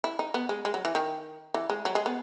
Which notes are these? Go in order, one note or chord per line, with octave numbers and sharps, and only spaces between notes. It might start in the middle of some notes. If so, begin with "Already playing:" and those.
E4
D#4
B3
G#3
G#3
F#3
E3
D#3
E3
G#3
F#3
G#3
B3